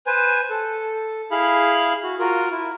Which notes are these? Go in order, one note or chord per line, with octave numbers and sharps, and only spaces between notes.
B4 C5 G#5
A4
E4 G#4 F5 B5
F#4
F4 F#4 A#4
E4